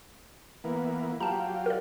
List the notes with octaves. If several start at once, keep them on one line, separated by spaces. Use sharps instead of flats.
E3 A#3 B3
F#3 F4 G4 A5 A#5
A#4 D5